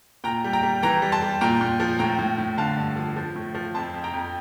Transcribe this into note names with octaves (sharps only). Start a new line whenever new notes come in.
A#2 G5 A#5
G3
G5 A#5
G3
E3 G5 A#5
G3
A5 C6
G3
A#2 G5 A#5
A#2
F3
A2 G5 A#5
A2
A2
D3 F5 A5
G2
F3
F3
A2
F3
F2 A5 C6
F2
G5 A#5
F2